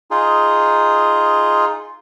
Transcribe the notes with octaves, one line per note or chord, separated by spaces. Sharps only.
D#4 F4 G#4